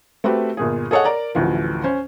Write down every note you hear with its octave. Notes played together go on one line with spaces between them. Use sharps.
A3 C4 F#4 G4 B4
G1 A#2 G#4
G#4 A4 C#5 D#5 F#5
A#4 D5 A#5
A1 D2 E3 F3
C#4 C5